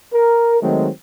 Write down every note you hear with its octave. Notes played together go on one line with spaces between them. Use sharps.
A#4
D#3 F#3 G#3 A3 C4